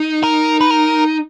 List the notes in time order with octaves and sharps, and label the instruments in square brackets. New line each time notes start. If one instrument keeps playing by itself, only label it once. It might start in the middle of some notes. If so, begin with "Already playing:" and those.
Already playing: [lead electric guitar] D#4
[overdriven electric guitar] A#4
B4
A#4